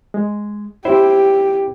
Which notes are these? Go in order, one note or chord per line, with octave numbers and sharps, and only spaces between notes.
G#3
C4 E4 G4 C5